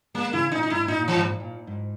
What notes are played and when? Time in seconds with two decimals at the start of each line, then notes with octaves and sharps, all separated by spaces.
0.14 G#3 A#3 B3
0.33 C#3 E3 E4
0.52 A#2 D#4
0.63 D#4
0.70 G#2 E4
0.84 A#2 D#4
0.98 A#2
1.08 G#2 E3
1.25 A#2
1.40 A#2
1.67 G#2